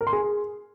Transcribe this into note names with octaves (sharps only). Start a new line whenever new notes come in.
A#4
C6
G#4